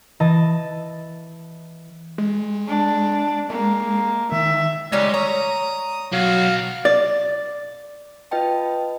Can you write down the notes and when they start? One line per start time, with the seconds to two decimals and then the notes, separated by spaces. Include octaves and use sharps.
0.20 E3 D#5 A5
2.18 G#3
2.68 D4
3.50 G#3 A#3
4.32 D#3 E5
4.92 C#3 G3 G#3 D#4 C#5 D#5
5.14 C#5 A#5 D#6
6.13 B1 F#3 F#4 F5
6.85 D5
8.31 F4 B4 D#5 G5 A5